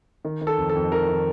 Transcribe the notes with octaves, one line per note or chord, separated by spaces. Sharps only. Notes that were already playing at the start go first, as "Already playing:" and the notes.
D#3
D#3
A4
F2
A4
F2
D#3 A#4
D#3